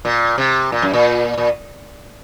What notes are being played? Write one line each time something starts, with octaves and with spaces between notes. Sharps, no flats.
A#2
C3
A#2
F#2
A#2
A#2